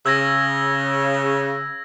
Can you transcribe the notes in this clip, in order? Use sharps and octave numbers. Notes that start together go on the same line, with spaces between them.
C#3 E6 G#6 A#6